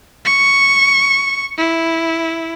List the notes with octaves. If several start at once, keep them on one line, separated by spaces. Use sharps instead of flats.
C#6
E4